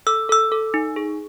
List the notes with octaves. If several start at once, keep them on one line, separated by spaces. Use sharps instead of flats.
A4 E6
A4 E6
A4
D#4
G#4